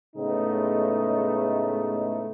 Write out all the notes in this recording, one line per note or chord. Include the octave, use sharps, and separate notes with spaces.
A2 C#3 G#3 A3 B3 D#4